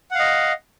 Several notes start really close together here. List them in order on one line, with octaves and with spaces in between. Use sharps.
F#5 F5 D#5